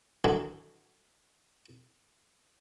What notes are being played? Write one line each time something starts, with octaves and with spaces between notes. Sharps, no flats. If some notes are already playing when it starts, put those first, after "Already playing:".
A2 D3 D#3 F#3